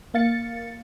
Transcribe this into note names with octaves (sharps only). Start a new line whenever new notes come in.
A#3 F5 A6 C#7